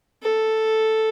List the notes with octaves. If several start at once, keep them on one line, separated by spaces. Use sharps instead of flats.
A4